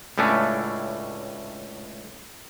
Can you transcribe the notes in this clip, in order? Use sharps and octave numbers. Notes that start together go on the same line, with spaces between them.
C#2 A2 A3 C#4 D4